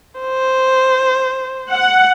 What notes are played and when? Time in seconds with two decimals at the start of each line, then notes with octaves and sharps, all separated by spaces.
0.20 C5
1.72 F#5